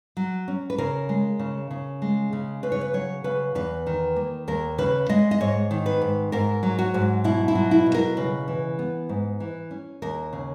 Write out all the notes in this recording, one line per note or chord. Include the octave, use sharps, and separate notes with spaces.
F#3
C#4
B4
C#3 A#4
G#3
C#3
C#3
G#3
C#3
C#3 B4
C#5
B4
F#3 C#5
C#3 B4
E2 B4
D#3
A#3
D#2 A#4
C#3 B4
G#3 D#5
D#5
G#2 C#5
D#3
B4
G#2
G#2 A#4
F#3
F#4
G#2
B2 E4
E4
F#3
E4
B2
A#4
C#3 B4
E3
B3
G#2
E3
C#4
D#2 A#4
C#3